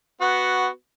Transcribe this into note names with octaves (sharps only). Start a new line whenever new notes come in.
B3 F#4